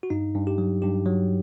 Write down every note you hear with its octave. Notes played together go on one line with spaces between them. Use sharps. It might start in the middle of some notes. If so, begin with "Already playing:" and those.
F#4
G2 D#4
G2
G4
F#3
G2 G4
F#3